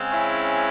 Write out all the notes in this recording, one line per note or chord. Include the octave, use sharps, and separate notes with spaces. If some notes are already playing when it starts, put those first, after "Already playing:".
Already playing: C#3 G#3 C4
C#4 E4